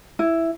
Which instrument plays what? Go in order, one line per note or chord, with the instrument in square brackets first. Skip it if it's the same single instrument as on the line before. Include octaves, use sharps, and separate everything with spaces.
[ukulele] E4